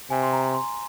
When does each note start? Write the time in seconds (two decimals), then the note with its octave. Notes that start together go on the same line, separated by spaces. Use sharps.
0.10 C3 G#5
0.23 C6
0.33 A#5
0.54 C6